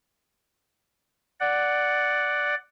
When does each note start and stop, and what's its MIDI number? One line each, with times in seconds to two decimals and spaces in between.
1.40 2.55 74
1.40 2.55 78